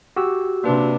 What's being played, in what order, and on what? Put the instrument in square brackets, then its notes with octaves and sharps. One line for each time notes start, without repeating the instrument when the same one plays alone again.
[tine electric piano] F#4 G4 E6
[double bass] C3 D4 [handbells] A#3 B4